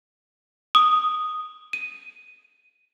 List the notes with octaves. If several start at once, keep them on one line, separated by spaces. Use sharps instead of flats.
D#6
D#7